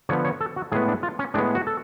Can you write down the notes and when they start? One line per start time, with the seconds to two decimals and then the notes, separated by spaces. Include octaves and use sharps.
0.09 D3 F3 B3 C#5
0.25 C#5
0.41 A4
0.56 F#4
0.72 A2 G#3 B3 G#4
0.88 D4
1.03 F4
1.19 C#4
1.34 A2 G#3 B3 D4
1.55 F#4
1.67 A4